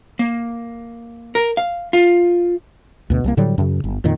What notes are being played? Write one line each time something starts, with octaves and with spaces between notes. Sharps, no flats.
A#3
A#4
F5
F4
D2 B2
C2 G3 A#3
A2 D3 F#3 G3
F#2 C#3
G1
F2 A#2 D#3